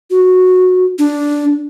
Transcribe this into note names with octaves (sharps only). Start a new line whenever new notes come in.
F#4
D4